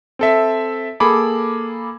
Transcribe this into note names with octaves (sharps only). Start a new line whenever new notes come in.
C4 A4 E5
A#3 G#4 A4 B5 D6